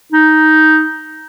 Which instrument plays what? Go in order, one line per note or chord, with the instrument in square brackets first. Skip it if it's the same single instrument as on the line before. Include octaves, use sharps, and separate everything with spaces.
[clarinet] D#4